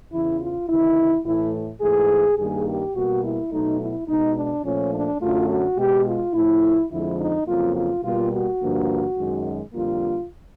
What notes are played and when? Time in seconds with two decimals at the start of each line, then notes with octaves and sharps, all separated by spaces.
0.12 E2 C#3 E3 E4
0.40 F4
0.68 D2 C3 D#3 E4
1.25 A2 E3 A3 E4
1.81 G#2 E3 A3 G#4
2.38 G2 D#3 G3 A#3 G#4
2.67 G4
2.95 B2 G3 A#3 F#4
3.23 E4
3.51 B2 F#3 A3 D#4
3.79 E4
4.07 B2 G#3 D#4
4.36 D4
4.64 A#2 F3 A3 C#4
4.93 D4
5.21 F#2 D3 F#3 A3 F4
5.49 F#4
5.78 B2 G#3 G4
6.05 F4
6.34 A2 F3 A3 E4
6.91 F2 D3 F3 G#3 E4
7.19 D#4
7.47 F2 C#3 F#3 A#3 F4
7.75 F4
8.04 B2 G3 A#3 F4
8.32 F#4
8.61 G2 D3 F3 A#3
9.17 F#2 D#3 G#3
9.73 F2 D3 G3 A#3 F4